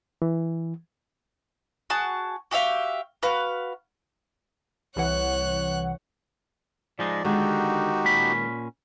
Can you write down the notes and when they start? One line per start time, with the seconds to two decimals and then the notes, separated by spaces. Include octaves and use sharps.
0.22 E3
1.90 F#4 G#4 A5
2.51 F#4 G4 E5 F5
3.23 F#4 B4 F5
4.96 C2 E3 C#5 F#5 F#6
6.99 F3 G#3 D#4 D5
7.25 D3 D#3 G#3 B3 D#4 F#4 G4
8.05 A#2 C#4 B5